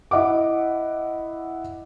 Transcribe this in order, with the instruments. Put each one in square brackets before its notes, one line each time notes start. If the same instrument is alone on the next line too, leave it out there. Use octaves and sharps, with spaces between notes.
[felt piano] E4 D#5 F#5 D6